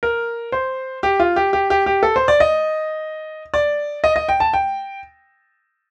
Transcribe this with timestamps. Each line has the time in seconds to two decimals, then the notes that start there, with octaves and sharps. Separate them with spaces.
0.03 A#4
0.52 C5
1.03 G4
1.20 F4
1.36 G4
1.53 G4
1.70 G4
1.86 G4
2.03 A4
2.16 C5
2.28 D5
2.40 D#5
3.54 D5
4.04 D#5
4.16 D#5
4.29 G5
4.40 A5
4.53 G5